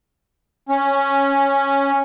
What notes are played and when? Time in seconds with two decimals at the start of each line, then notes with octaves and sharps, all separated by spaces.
0.69 C#4